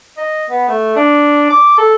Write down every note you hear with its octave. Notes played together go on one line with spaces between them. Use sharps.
D#5
B3
A3
D4
D6
A4